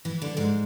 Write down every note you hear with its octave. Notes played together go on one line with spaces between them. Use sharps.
E3 E4
D3 D4
G#2 G#3